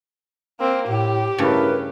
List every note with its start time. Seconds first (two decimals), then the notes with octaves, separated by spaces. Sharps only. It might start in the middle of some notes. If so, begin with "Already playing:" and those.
0.60 A#3 C4
0.88 A2 G4
1.38 G2 C#3 A3 E4 A#4 B4